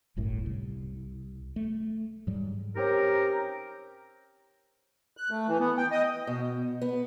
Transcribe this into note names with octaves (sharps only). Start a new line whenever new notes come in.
D1 G1 F#2 A2
C2
A3
G#2 F#3 G3
C4 C#4 D#4 G4 A#4
F#6
A3
E3
B3
G5
D#5
B2
B3